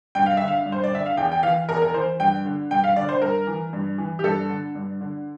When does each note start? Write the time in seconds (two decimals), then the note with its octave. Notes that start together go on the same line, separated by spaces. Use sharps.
0.15 G2 G5
0.26 F5
0.37 D3 E5
0.48 F5
0.66 G2
0.72 C5
0.84 D5
0.92 D3 E5
1.06 F5
1.17 E2 G5
1.32 G5
1.43 E3 F5
1.69 E2 A#4
1.82 A#4
1.94 E3 C5
2.20 G2 G5
2.45 D3
2.71 G2 G5
2.84 F5
2.96 D3 D5
3.09 C5
3.22 G2 A#4
3.47 E3
3.73 G2
3.98 E3
4.19 G4
4.24 G2 A4
4.49 D3
4.75 G2
5.01 D3